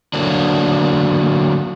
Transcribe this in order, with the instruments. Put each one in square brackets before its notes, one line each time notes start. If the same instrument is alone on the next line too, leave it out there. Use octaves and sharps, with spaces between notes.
[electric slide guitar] D3 F#3 A#3 D4